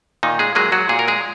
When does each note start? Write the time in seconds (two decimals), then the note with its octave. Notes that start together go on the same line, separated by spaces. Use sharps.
0.23 A#2 D#3 D#4
0.39 G#3 G#4
0.55 F#3 G#3 A#3 G#4
0.72 F#3 F#4
0.89 A#2 G#4
0.99 A#4
1.08 G#3 G#4